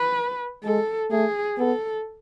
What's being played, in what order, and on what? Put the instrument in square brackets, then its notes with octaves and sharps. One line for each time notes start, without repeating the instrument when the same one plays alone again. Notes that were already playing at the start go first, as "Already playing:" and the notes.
Already playing: [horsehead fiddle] B4
[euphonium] G#3 [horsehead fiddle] A4
[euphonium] A3 [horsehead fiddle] G#4
[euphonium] B3 [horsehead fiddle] A4